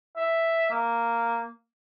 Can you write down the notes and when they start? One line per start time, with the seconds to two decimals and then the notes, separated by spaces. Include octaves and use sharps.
0.17 E5
0.71 A#3